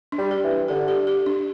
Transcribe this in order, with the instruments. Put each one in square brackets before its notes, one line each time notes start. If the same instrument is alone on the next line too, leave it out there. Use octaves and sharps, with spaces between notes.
[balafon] D4
[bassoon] G3
[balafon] G4
[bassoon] E3
[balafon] D4
[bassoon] D3 [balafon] G4
[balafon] G4
G4
D4